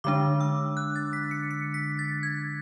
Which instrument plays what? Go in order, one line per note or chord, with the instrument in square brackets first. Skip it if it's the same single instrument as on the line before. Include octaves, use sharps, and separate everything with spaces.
[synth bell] D3 G#3 D4 D6
E6
F#6
A6
B6
C#7
C#7
B6
A6
G#6